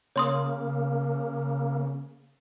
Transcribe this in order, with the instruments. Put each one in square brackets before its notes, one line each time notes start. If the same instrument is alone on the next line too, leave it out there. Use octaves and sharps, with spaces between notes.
[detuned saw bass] C#3 [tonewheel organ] A#3 [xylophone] C#5 C6 D#6